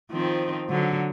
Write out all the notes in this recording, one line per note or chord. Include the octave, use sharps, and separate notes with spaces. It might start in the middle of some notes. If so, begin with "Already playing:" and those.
D#3 F3 C4
D3 F#3